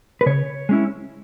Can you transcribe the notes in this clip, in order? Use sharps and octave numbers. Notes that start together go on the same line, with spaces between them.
B4
C#3 C#5
G#3 C#4 E4